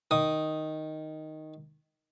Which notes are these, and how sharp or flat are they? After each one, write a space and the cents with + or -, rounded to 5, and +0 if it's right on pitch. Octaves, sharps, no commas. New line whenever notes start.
D#3 +0 D#6 +0